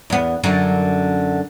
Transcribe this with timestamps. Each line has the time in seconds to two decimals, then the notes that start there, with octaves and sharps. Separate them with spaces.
0.10 E2 B3
0.44 F#2 D3